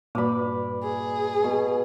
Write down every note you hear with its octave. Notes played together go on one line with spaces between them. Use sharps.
G2 A#2 F#4 B4 D5 B5 D6
G#4
B2